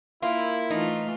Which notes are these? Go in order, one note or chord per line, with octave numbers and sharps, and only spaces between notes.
A#3 E4 F4
E3 A3 D#4 F4